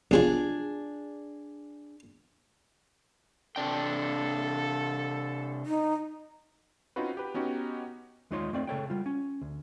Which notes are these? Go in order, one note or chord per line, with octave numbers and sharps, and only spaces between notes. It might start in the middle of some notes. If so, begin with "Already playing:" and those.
B1 C3 F3 D4 G#4
C3 D4 A4 G5
D#4
C4 C#4 D#4 F4 F#4 B4
G4 B4
B3 C#4 D#4 F#4 G4
D#2 G#3 D#4 F4 C#5 C6
A3 C4 D5
C#3 A4 C#5 G5
G3 F4
C#4
D2